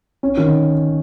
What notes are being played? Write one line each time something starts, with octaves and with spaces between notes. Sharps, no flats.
C#4
D#3